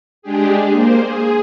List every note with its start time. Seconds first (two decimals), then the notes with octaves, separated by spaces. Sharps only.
0.22 G#3 D4 G4 G#4
0.70 A#3 C5
1.00 G#4